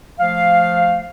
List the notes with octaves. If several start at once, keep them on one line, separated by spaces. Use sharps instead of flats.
F3 A3 F5